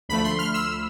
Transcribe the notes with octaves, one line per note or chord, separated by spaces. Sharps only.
D2 D3 F3 A3 B5
C6
F6
E6